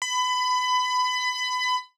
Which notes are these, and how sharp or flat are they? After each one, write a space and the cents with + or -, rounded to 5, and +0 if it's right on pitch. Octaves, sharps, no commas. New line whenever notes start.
B5 +25